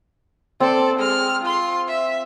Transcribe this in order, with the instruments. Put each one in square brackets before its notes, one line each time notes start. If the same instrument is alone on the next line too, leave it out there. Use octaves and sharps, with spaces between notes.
[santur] C4 [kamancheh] A4 D5
[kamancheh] G#3 F6
F4 C6
E5